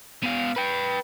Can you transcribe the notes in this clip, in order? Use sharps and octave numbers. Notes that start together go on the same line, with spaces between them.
B2 F5
B4 G5